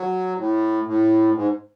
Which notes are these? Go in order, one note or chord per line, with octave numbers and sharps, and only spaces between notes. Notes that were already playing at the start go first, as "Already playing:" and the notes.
Already playing: F#3
A2
A2
G#2